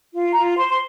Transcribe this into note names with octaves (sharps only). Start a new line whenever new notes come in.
F4
F4 A#5
C5 C6
C6